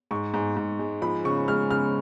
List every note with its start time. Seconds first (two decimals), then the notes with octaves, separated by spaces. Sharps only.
0.11 G#2 C#6
0.34 G#2
0.56 G#2
0.79 G#3
1.02 F3 B5
1.25 C#3 C#6
1.48 G#3 F6
1.71 C#3 F6